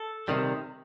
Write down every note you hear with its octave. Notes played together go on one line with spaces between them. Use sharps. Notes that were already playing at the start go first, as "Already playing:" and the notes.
Already playing: A4
C3 D#3 G3